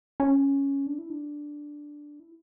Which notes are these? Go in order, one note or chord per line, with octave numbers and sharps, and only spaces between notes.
C#4
D4
E4
D4
E4